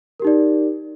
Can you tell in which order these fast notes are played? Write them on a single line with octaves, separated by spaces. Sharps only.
A#4 G4 D#4 D5